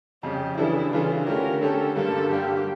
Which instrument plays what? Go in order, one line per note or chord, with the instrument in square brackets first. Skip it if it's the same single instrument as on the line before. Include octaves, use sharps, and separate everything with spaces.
[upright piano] F2 C#3 G3 [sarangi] G4
[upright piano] C#3 E3 G3 D4 A4 [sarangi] E4
[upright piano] C#3 E3 G3 D4 A4 [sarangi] F4
[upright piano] D3 A3 C#4 G4 [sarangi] A#4
[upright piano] D3 A3 C#4 G4 [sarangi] A4
[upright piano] G2 D3 G3 A#3 [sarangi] A4
[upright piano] G2 D3 G3 A#3 [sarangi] G4